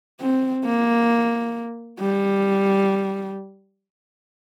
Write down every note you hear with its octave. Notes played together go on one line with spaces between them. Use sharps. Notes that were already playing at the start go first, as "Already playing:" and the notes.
C4
A#3
G3